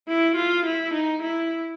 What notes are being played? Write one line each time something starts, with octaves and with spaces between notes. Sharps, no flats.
E4
F4
E4
D#4
E4